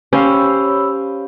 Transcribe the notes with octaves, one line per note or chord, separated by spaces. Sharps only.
C#4 G4 C5 C#5 F5 B5 E6